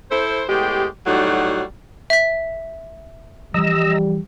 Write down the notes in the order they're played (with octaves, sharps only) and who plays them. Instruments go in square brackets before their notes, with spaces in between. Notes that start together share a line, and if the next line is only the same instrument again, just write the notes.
[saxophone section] E4 A4 C5
A2 G#3 B3 G4
A2 F#3 G3 D#4 F#4
[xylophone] E5 B6
[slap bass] E3 F3 [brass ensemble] G3 [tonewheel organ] D#5 A#5 E6